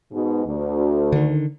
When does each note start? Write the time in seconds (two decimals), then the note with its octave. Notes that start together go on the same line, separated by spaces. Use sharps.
0.12 G#2 B2
0.46 D2
1.12 D3 D#3